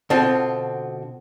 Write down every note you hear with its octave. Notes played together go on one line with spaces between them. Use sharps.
B2 D3 C4 F4